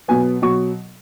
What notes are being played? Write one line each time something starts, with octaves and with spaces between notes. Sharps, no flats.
B2 F#3 B3 G#5
B2 F#3 C#6